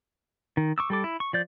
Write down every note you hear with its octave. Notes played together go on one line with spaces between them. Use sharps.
D#3
C#6 D6 E6
G3 A4 D6
E4
C#6
F3 D5 G6